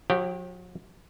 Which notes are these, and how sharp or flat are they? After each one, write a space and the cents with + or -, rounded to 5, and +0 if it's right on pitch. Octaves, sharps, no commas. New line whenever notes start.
F#3 -45 G4 -5